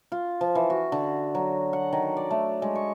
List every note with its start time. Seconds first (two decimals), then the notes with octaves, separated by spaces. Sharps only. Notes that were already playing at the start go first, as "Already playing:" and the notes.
0.12 F4
0.41 F3
0.55 E3
0.70 F#4
0.92 D3
1.35 F#3
1.73 F#5
1.93 D#3
2.17 D5
2.31 A3
2.62 G#3
2.75 C#6